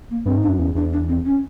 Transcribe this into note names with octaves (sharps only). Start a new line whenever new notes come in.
A#3
G2 C4
G#2 D4
F#2
E2 C#4
E2 D4
D4
C4
C#4